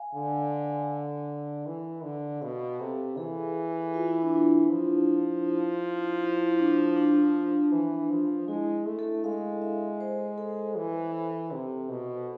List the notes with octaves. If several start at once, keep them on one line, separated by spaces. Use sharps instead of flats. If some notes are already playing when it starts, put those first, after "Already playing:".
Already playing: F5 G#5
D3
E3
D3
B2 F5
C3 A4
E3 G#4
F4
E4
D4
E4
F3
E4
D4
D4
E3
F3
G#3 E4
A3
A4
G#3 F5
E5
C5
A4
E3
C3
B2